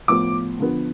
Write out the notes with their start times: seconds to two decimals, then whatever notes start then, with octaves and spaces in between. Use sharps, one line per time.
0.08 A2 F3 B3 D6
0.59 D3 F3 B3